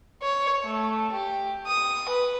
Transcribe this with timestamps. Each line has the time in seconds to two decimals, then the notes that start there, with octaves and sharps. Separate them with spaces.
0.22 C#5
0.63 A3
1.12 G4
1.67 D#6
2.09 B4